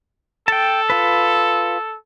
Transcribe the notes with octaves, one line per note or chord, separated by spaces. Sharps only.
A4 G5 A5
F4 B4